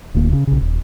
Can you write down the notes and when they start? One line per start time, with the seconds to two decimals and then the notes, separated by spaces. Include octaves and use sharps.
0.14 D1 D2 A#3
0.32 C#3
0.47 B1 C#3
0.61 D#1